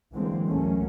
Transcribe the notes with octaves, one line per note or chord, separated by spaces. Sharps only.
D3 E3 F#3 G#3 A#3 C4
C#2 G#2 F#3 A3 A#3 C#4